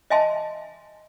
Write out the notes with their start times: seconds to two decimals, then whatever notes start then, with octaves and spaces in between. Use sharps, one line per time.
0.10 D#5 E5 G#5 A5 C6